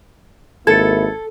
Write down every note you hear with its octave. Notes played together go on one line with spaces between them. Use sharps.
G#1 A#3 E4 A4 G#6 A6 C#7